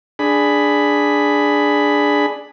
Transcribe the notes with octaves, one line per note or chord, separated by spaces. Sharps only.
D4 G#4 B5